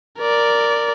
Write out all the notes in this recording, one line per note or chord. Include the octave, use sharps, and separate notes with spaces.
A#4 D5